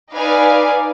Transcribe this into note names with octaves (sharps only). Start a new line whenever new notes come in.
D#4 B4 D5 F5 G#5